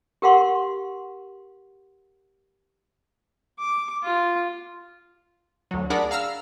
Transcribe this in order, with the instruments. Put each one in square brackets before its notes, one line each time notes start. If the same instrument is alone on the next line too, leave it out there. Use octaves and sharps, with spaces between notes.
[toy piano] G4 A#4 F5 F#5 C6 C#6
[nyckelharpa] D6
F4
[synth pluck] D2 F#3
D4 G#4 A#4 D5 F#5 B5
F5 A#5 E6 F6